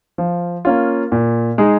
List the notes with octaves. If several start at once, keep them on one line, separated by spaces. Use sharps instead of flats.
F3
A#3 C#4 F4
A#2
G#3 D#4 G#4